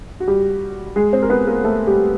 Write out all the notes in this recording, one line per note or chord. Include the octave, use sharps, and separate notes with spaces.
F#4
G3 G4
G#3 G#4
C4 C5
A#4
B3 B4
A#3 A#4
A3 A4
G3 G4